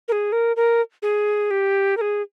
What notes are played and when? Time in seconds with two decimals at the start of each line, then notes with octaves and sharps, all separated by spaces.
0.08 A#4
0.12 G#4
0.32 A#4
0.56 A#4
1.02 G#4
1.51 G4
1.97 A#4
2.01 G#4